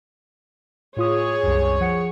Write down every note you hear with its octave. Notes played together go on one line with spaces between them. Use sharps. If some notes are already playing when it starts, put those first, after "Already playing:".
A2 F4 G#4 C#5 D#6
C2 F#2
F3 F#5 C#7